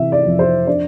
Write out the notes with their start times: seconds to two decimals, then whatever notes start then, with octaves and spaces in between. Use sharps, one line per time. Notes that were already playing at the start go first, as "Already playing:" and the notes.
Already playing: C3 E3 E5
0.12 D5
0.26 F2
0.39 C5
0.67 D4 D5